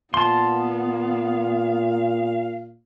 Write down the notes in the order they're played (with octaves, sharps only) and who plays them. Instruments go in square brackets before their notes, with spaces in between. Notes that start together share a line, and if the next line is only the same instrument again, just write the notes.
[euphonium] A#2 [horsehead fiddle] B3 [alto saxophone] F5 [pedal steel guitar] A5 C6